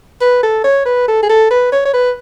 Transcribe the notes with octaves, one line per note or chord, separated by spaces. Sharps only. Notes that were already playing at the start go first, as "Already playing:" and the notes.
B4
A4
C#5
B4
A4
G#4
A4
B4
C#5
C#5
B4